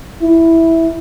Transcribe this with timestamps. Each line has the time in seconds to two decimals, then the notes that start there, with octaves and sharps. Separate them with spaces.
0.22 E4